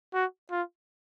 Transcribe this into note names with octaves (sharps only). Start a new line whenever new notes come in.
F#4
F4